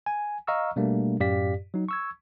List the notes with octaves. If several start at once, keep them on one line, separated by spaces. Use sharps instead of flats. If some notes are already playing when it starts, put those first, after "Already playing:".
G#5
D#5 F5 A#5 C#6 E6 F6
B2 G3 A3 A#3 D4
F#2 A2 G4 D5 F5 B6
F#3 D#4
C#6 E6 G#6